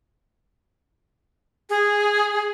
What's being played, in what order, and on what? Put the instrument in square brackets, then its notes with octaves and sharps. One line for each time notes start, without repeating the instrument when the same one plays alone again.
[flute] G#4